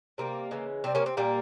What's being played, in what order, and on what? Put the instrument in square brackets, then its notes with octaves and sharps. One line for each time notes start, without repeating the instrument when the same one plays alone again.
[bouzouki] C3 G3 A#3
C#3 E3 G#3
C3 G3 C4
A#3 C#4
C4
A#2 G3 A#3